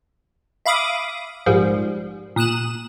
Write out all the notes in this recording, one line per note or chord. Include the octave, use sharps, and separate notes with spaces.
E5 F5 B5 D6 D#6
A#1 G#2 F3 G3
A#2 D#6 F#6 E7